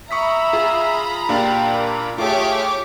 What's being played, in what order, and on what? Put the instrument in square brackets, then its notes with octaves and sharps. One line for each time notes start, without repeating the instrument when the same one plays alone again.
[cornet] E5 [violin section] A#5 B5 [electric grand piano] C#6 D#6 B6
[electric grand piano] F4 G#4
[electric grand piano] A#2 D4 F5 [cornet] G4
[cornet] A#3
[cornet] A3 [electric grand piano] F4 G#4 [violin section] G4 C#5 D6